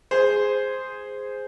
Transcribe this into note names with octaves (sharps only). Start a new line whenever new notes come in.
G#4 C5